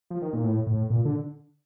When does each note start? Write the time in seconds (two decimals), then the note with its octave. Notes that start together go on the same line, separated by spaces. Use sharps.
0.11 F3
0.22 D#3
0.33 A#2
0.44 A2
0.67 A2
0.90 A#2
1.05 D3